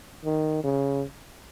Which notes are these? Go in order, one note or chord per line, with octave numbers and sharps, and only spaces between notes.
D#3
C#3